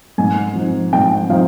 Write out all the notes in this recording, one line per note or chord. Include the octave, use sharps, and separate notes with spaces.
G#2 G#5
F3 C4 D#4
G#2 G5
F3 C4 D#4 F5